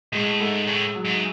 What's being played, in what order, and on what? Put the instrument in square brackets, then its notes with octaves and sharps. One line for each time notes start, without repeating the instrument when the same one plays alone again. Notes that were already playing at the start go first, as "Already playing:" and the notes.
[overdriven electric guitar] A2 [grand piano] G#3
[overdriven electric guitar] G#2 [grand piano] A3
[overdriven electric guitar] A2
[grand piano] F#3
[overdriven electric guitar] G#2